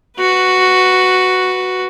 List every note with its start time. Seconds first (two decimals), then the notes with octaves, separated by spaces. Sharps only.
0.18 F#4 B4